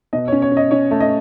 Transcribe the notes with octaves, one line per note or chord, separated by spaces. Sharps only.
B2 D#5
C#4 C#5
C#5
C#4
D#5
C#4 C#5
A3
D#5